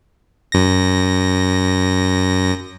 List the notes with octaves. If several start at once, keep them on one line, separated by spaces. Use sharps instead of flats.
F#2 A#6